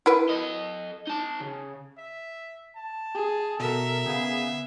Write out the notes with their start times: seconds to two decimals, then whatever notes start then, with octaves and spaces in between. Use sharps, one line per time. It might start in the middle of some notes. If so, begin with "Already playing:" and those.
0.06 E4 A#4 B4
0.29 A4 D#5
1.07 D#4 A5
1.41 C#3
1.98 E5
2.76 A5
3.15 G#4
3.60 B2 A4 A#4 E5
4.06 C#3 B3 G#4 F5